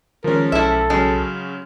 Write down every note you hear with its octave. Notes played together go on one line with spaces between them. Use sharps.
D#3 F3 G#3 C#4 A#4
B1 E4 A4 E5
C#3 F#3 G#3 C#4